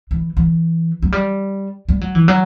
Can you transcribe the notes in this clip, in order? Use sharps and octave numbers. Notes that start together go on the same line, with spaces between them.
E3
E3
F#3
G3
G3
F#3
E3
F#3